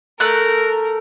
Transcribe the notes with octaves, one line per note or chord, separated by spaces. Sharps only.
A3 A#4 F#6